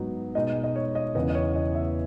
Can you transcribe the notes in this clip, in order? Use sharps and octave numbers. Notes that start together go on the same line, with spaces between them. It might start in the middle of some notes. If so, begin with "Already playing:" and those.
Already playing: G#2 F#3 B3 D#4
B2 G#3 D#4 D#5
D#5
C#5
D#5
E2 C#3 E3 B3 D#5
D#5
C#5
D#5
E5